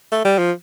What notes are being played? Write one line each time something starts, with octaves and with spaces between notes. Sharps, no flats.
A3
G3
F3